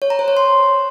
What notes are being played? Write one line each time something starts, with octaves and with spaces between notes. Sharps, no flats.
C#5
A#5
C5
C#5
C6